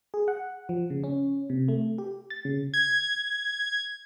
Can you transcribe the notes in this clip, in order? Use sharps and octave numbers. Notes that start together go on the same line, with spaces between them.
G#4
F#5
F3
C#3
C#4
C3
A3
G4
A6
C#3
G#6